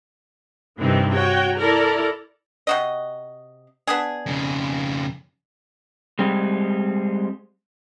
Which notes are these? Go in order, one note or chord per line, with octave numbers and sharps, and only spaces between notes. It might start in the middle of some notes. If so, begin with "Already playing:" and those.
G2 C3 D#3 E3 C4
F#4 C#5 G5
E4 A4 A#4 D5 A#5
C3 F#4 D#5
B3 D4 G#4
F2 C#3
G3 G#3 C4